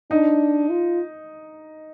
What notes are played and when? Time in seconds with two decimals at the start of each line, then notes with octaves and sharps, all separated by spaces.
0.11 D4 D#4
0.70 F4